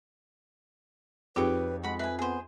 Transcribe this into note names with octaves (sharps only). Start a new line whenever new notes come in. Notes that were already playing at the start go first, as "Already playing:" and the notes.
F2 D#4 G4 G#4 B4 C#5 G5 D6
G#3 F#4 B5
B4 E5 G#5
B3 G#4 C5